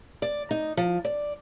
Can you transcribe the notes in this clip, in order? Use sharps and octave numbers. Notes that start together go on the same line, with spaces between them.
D5
D#4
F3
D5